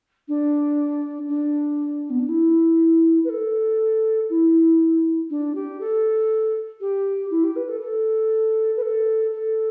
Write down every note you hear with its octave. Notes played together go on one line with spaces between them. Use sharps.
D4
D4
B3
D4
E4
B4
A4
E4
D4
G4
A4
G4
E4
G4
B4
A4
A4
B4
A4
A4